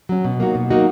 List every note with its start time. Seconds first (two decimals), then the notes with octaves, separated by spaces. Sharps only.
0.09 F#3 C#4
0.25 B2
0.40 F#3 A#3 D#4 F#4
0.55 B2
0.70 F#3 A#3 D#4 F#4